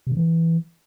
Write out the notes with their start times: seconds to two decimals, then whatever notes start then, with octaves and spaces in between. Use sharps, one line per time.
0.07 C3
0.12 D3
0.17 E3